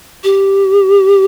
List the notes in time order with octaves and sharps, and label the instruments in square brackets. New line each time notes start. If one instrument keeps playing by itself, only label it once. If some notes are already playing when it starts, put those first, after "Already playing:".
[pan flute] G4